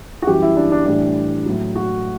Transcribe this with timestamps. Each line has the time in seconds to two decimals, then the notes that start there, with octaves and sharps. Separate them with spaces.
0.22 F#4
0.26 F#2 E3 G3 G4
0.42 E4
0.57 D4
0.72 D4
0.86 A2 E3 G3 D4
1.46 A2 F#3
1.76 F#4